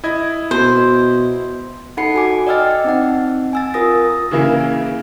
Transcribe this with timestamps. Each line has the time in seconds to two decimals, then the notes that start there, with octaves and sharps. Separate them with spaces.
0.04 E4 D#5 G#6
0.51 B2 C5
1.97 D#4 A4 F#5 B5 C7 C#7
2.14 F#4 G#5 D6
2.47 D5 D#5 G5 E6 F6 A6
2.84 C4 D#4 F#5
3.53 G#5 E6 A6
3.74 F4 A#4 D#6 A#6
4.31 C#3 E3 A#3 E4 G#4